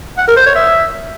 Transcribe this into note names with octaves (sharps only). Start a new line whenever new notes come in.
F#5
A#4
C5
C#5
E5